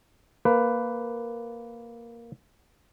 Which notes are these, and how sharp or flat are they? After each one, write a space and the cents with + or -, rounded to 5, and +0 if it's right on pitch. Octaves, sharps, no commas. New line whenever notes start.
A#3 +0 B4 +10